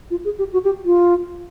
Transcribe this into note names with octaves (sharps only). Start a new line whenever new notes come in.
F4
G#4
G4
F#4
G4
F4